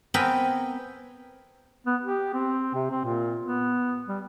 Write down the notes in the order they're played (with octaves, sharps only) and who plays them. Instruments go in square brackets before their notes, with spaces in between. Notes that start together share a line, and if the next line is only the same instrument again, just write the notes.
[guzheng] B3 C4 A#4 B4 G5 G#5
[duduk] B3
G4
C4
C3
C4
A#2
B3
G3